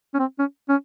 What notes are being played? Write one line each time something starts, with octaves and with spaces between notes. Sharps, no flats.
C#4
C4
C#4
C#4